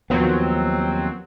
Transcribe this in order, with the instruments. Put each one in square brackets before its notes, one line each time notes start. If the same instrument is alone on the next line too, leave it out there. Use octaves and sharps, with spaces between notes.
[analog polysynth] D#2 F#3 C4 [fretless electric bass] F3 B3